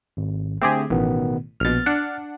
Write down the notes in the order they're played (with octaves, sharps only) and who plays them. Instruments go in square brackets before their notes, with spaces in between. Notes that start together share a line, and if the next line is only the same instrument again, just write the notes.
[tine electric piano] G#1
[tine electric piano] D3 A3 [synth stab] C4 G4 G#4
[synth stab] A1 [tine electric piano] B2 D#3 B3
[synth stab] A#1 B2 [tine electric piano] F6 A6
[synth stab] D4 F#5